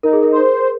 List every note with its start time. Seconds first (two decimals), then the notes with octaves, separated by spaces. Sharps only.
0.03 D#4 A#4
0.13 G#4
0.23 A#4
0.32 C5